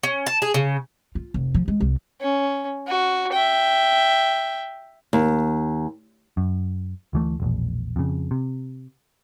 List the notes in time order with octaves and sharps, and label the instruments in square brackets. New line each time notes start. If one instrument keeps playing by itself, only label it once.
[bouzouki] C#4
A5
G#4
C#3
[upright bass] F4
F1
F3
G#3
C2
[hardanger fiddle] C#4
F#4
E5 G5
[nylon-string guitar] D#2
[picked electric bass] F#2
D2 E3 A3
E1 A#1
F2 C#3
C3